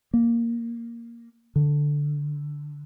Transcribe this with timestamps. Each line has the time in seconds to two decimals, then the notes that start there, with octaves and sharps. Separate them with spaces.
0.14 A#3
1.56 D3